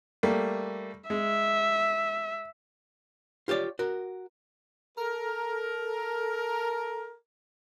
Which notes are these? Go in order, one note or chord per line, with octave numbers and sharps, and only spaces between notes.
G3 A3 A#3
G#3 E5
F4 G4 C#5 D5
F#4 A#4
A4 A#4